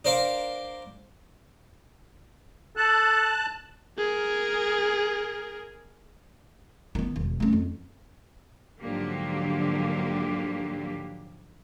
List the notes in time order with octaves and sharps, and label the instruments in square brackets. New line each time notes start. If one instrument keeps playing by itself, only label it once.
[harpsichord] D4 A#4 C5 F5 C6
[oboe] A4 [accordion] A5 F#6
[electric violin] G#4 A#4
[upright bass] D#3 B3
E1
A3 C#4
F2
[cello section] G#2 D3 F3 F#3 A#3 G4